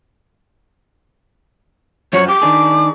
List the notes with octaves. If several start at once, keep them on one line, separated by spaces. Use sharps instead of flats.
F#2 F3 F#4 C#5
G4 D6
D#3 D4 G#4